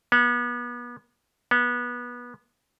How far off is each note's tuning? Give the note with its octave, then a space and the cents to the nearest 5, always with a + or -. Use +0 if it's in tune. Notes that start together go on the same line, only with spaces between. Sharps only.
B3 -35
B3 -25